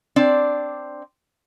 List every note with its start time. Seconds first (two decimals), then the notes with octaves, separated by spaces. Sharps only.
0.16 C4 D4 D5